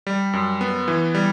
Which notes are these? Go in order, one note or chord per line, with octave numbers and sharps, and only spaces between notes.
G3
F#2
B3
E3
G3